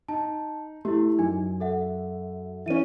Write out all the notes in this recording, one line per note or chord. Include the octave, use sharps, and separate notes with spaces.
D#4 A5
A3 E4 G4
F#2 D#4 G#5
A4 E5 F#5
E3 C#4 E5 D#7